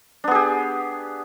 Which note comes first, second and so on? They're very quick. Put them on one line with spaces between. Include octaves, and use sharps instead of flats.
D4 B3 G#4 G4